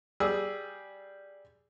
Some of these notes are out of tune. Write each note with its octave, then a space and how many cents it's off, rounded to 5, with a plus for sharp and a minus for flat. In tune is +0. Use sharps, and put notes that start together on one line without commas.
G3 +0 G#4 +0 E6 +0